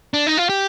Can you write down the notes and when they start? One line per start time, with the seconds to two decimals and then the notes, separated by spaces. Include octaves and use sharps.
0.14 D4
0.27 D#4
0.37 F4
0.49 G4